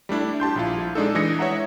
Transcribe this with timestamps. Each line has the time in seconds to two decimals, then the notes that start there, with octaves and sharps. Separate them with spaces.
0.09 G3 A3 D4 E4
0.40 G4 A5 C6 G6
0.56 A#1 E4 F4
0.95 G#3 D4 D#4 A4
1.15 E3 G#3 D#6 A#6 C#7
1.39 C#5 E5 F#5 A#5